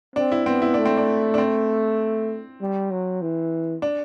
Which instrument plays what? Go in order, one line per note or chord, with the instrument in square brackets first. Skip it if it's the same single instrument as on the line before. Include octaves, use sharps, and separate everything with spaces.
[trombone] C4 [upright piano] D4
[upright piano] E4
[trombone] B3 [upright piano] C4
[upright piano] E4
[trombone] A3 [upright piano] D4
[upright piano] C4
D4
D4
C4
[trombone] G3
F#3
E3
[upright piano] D4